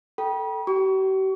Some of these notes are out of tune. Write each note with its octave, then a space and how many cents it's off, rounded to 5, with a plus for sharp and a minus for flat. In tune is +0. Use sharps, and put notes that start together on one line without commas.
A4 +0 G5 -10 B5 -40
G4 -45 C#6 +35